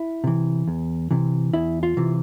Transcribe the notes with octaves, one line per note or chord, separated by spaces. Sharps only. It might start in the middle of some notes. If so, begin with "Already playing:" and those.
Already playing: E4
C3 E3
E2
C3 E3
E2 E4
F4
C3 E3